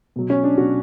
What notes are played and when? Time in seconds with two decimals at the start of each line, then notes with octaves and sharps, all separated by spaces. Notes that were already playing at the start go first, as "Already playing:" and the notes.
0.16 B2 F#3
0.30 C#4
0.44 D4
0.57 B2 F#3 F#4